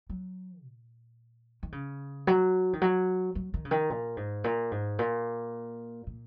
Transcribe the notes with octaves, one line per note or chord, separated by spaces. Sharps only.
F#3
A#2
D#3
C#3
F#3
D#3
F#3
F#3
D#3
C#3
D#3
A#2
G#2
A#2
G#2
A#2
A#2